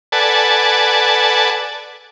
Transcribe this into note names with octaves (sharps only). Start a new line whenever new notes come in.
A4 B4 D5 F#5 G#5 A5